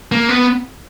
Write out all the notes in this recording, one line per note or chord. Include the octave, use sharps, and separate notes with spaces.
A#3
B3